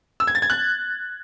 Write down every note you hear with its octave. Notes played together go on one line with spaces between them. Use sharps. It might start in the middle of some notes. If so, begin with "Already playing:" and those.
E6
G#6
A6
G#6
F#6